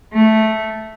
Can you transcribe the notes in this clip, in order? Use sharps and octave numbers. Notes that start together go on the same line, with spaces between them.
A3